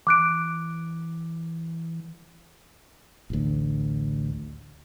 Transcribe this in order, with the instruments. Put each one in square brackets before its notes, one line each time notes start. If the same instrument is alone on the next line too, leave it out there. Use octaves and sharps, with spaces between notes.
[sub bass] E3 [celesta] D6 F#6 D7
[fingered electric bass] A1 D2